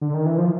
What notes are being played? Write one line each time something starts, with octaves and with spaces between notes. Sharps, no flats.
D3
D#3
E3
F3